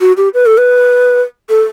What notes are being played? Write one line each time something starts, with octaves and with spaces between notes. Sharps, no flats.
F#4
G4
B4
A4
B4
A4